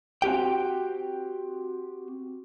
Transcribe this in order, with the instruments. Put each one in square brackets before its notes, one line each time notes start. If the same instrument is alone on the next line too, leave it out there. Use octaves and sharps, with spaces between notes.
[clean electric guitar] C4 F#4 G4 G5